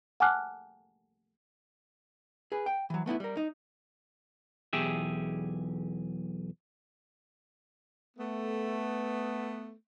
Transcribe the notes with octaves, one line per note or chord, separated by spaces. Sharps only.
F#5 G#5 A5 D6 F6 F#6
G#4 B4
G5
E3 F#3
A3 B3 D#4 E4
G3 A#4
D#4
B1 E2 G4 G#4 E5
A3 B3